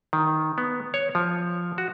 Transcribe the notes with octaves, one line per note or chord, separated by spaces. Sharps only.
D#3
B3
C#5
F3
F#4